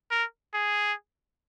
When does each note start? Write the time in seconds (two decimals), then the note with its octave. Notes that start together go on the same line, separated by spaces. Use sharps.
0.11 A#4
0.54 G#4